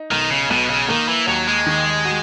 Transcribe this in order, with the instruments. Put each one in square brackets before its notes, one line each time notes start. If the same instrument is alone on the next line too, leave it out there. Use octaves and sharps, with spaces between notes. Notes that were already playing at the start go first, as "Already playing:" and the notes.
Already playing: [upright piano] D#4
[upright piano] B1 [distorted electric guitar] D#3
[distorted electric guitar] C#3
[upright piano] B1 [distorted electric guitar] B2
[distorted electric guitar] C#3
[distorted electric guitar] D#3 [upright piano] A#3
[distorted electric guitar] E3
[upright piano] D#2 [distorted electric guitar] F#3
[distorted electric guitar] G#3
[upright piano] D#3
F#4